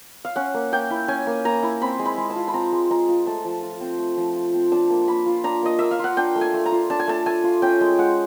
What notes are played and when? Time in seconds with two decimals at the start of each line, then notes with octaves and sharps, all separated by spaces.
0.25 F5
0.36 C#4 F#5
0.54 A#3
0.72 A#3 G5
0.90 E4
1.08 C#4 G#5
1.27 A#3
1.45 A#3 A#5
1.63 E4
1.81 C4 B5
1.99 G#3
2.06 B5
2.18 G#3
2.30 A5
2.36 F4
2.48 B5
2.53 C4 A#5
2.72 G#3
2.90 G#3 A#5
3.09 F4
3.27 A3 A5
3.45 F3
3.63 F4
3.80 C4
3.99 A3
4.17 F3
4.36 F4
4.54 C4
4.72 D4 A5
4.90 A#3
5.08 A#3 B5
5.26 F4
5.44 D4 A#5
5.62 A#3 D#5
5.79 A#3 E5
5.91 F5
5.99 F4 F#5
6.17 D4 G5
6.36 A3
6.41 G#5
6.54 A3
6.66 A#5
6.72 F4
6.90 D4 A5
6.99 G#5
7.08 A3 A5
7.26 A3 G#5
7.44 F4
7.62 C#4 G5
7.81 G#3
7.99 G#3 F#5